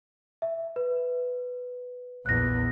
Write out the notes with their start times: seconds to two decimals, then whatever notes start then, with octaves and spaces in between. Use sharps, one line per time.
0.42 E5
0.76 B4
2.26 A#1 E2 F#6 A#6